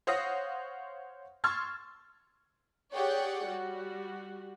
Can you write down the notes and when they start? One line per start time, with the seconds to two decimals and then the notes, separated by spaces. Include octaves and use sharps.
0.07 C5 C#5 F5 F#5 D#6 A#6
1.44 C6 C#6 E6 F6 G#6 A6
2.93 G4 G#4 C#5 D5 F#5 G5
3.47 G3 F#4